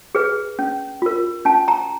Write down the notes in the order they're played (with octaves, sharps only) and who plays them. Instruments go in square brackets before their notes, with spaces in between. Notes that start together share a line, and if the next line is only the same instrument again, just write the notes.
[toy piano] G#4 B4
C#4
F4 A#4
C#4 A5
A#5